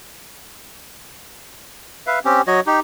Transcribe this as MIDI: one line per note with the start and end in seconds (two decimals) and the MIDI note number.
2.07 2.19 71
2.07 2.19 76
2.07 2.19 77
2.25 2.42 60
2.25 2.42 61
2.25 2.42 67
2.47 2.60 54
2.47 2.60 66
2.47 2.60 73
2.47 2.60 75
2.66 2.80 63
2.66 2.80 67